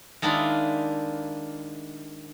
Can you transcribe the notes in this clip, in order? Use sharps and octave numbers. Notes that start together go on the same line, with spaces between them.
D#3 G#3 A#3 D4 E4 F4